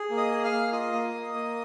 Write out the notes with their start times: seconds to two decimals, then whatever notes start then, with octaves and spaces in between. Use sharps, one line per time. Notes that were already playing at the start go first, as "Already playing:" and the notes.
Already playing: G#4
0.11 A#3
0.17 D#5 D#6
0.31 G#4
0.45 F5 F6
0.52 A#3
0.72 F4 D#5 D#6
0.93 A#3
1.13 A#3
1.34 A#3